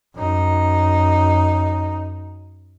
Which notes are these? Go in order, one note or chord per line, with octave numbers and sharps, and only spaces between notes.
F#2 D#4